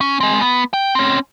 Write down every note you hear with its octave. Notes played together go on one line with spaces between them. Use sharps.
C#4
G#3 C4
B3
G5
C4 C#4